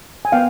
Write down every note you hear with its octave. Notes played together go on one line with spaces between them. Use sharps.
G#5
B3 F5 G5